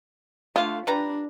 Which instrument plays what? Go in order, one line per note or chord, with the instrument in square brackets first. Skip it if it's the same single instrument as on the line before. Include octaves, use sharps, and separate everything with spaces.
[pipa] D3 F5 [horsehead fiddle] A3 [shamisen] F4
[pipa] G3 B4 A#5 [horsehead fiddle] D4